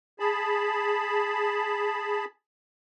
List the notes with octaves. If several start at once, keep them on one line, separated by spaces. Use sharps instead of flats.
G#4 A5 B5